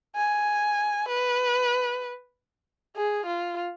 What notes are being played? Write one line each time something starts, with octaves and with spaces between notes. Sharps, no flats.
G#5
B4
G#4
F4